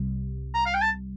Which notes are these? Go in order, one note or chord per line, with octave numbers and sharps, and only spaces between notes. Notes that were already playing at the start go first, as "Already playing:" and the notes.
Already playing: C2 C3 G3
A#5
F5
G5
A5